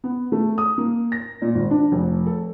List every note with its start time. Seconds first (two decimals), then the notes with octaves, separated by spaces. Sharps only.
0.04 B3
0.32 A3
0.58 D#6
0.78 A#3
1.12 A#6
1.42 A#2
1.55 G#1
1.71 D4
1.92 F1
2.26 A4